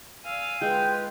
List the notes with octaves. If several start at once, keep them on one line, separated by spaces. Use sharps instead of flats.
D5 F5 G#5 E6
G#3 F4 B4 G5 G#6